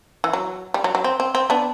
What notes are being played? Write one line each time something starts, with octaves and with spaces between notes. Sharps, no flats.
E3
F#3
G3
F#3
F#3
C4
C4
C4
B3 D4